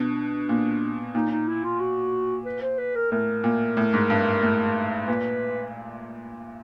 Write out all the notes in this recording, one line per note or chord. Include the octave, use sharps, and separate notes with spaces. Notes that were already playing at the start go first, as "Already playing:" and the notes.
Already playing: B2 D4
A#2
A#2 D#4
D#4
E4
F4
F#4
B4
C5
B4
A#4
A2 A#4
A#2
A2
G#2
G2
A2
A#2 B4